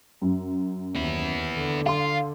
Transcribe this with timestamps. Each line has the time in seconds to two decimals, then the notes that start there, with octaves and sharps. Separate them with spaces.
0.22 F#2
0.96 D#2 B3 E4
1.55 D3
1.86 F4 F5 C6